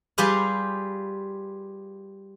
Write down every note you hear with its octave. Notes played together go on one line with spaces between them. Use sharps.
G3 F4 G4 G#4 B4 F5